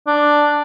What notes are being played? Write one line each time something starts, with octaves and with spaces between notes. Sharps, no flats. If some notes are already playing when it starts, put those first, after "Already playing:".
D4